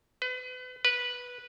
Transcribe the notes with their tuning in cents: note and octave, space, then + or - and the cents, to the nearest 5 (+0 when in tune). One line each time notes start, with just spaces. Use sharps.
B4 +35
B4 -10